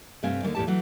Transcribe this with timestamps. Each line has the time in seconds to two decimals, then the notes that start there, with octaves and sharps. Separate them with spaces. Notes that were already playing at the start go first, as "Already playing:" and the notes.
0.23 G2 C3 A3 C4 F5 G#5
0.43 D#2 D3 A3 A#3
0.55 E2 A2 G4 A5
0.67 E3 F#3 A3